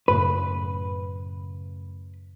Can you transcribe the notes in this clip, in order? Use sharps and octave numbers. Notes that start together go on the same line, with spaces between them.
F#2 A2 C#3 B4